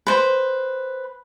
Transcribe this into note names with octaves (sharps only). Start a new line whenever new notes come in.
B4 C5